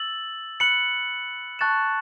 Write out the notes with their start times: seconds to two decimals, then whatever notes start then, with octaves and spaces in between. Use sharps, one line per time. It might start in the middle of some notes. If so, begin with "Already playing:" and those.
Already playing: E6 A6 F#7
0.60 B5 F#6 C#7 F#7
1.59 A5 C#6 F#6 A6 E7